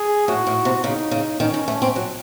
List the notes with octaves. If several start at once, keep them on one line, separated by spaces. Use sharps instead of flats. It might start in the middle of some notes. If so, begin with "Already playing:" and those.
Already playing: G#4
A2 F#4
A2
C3
C#3 D#4
C#3
D#3 C#4
D#3
A3
C4
F#3